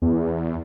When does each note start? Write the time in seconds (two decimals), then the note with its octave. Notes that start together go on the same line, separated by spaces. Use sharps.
0.02 E2